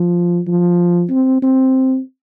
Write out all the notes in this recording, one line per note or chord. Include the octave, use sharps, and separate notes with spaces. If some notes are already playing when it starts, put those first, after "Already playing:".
Already playing: F3
F3
C4
C4